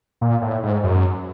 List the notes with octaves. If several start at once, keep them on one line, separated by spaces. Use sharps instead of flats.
A#2
A2
G#2
F#2